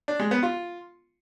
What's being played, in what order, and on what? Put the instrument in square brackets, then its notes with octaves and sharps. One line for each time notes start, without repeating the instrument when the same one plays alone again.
[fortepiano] D4
G#3
B3
F4